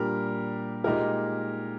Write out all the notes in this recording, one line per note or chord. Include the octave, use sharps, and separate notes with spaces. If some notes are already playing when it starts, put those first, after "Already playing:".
Already playing: A#2 G3 D4 G4 A#4
A#2 G#3 D#4 G4 A#4